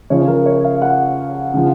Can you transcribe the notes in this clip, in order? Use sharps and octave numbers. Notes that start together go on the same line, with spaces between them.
C#3 F3 C#5
A#4
C#5
F5
F#5
C#3 F3